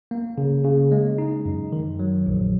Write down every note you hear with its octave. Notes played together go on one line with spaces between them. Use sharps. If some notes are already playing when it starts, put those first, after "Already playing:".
A#3
C#3
C#3
G#3
D#4
F#2
D#3
F#3
A#1